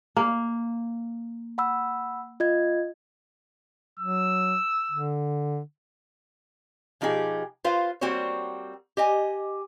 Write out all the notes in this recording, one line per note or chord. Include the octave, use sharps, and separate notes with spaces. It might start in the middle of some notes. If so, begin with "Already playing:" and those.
A#3
F#5 B5 E6
F4 D#5 G#6
F#3 E6
D3
B2 F3 D#4 G4 G#4
F4 B4 C5 F5
G3 A#3 C4 F#4 C5 C#5
G4 D#5 G#5